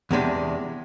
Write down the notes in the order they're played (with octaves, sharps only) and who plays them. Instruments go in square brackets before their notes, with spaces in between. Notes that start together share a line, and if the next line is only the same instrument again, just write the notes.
[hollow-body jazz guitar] E2 C3 G#3 D4